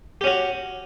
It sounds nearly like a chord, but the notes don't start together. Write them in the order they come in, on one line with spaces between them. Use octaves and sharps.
G4 C#4 F#4